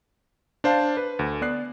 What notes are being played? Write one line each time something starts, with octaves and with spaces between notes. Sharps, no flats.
D4 C5 F5 A5
B4
D2
B3 D5 F#6 C7